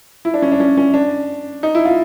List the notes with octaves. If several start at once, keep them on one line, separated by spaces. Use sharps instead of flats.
E4
D4
C#4
D4
C#4
C#4
D4
D#4
E4
F4